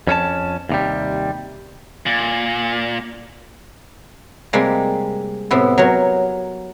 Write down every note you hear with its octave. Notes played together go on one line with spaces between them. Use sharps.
F2 C#4 A4 A5
D#2 C3 G3
A#2
C3 G3 G#3 A#3
A2 C3 B3 E4
F#3 A#4 C#5